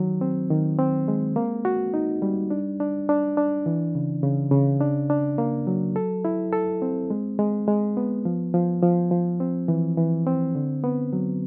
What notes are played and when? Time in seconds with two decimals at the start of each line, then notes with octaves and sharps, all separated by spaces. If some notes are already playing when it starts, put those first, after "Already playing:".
Already playing: D#3 F#3
0.21 C4
0.50 D#3
0.79 C4
1.08 G#3
1.36 A#3
1.65 F#4
1.94 D#4
2.22 G3
2.50 D4
2.80 D4
3.09 D4
3.37 D4
3.66 E3
3.95 C#3
4.23 C#3
4.51 C#3
4.81 D4
5.10 D4
5.38 A#3
5.67 F#3
5.96 A4
6.25 E4
6.53 A4
6.82 C4
7.10 G#3
7.39 G#3
7.68 G#3
7.97 B3
8.25 F3
8.54 F3
8.83 F3
9.11 F3
9.40 C4
9.68 E3
9.98 E3
10.27 C4
10.55 D3
10.84 B3
11.13 F#3